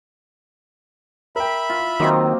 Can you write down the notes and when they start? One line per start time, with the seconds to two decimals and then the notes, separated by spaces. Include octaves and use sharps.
1.36 A#4 E5 G5 B5
1.70 F4
2.00 D#3 F#3 A#3 C4 D#5 C6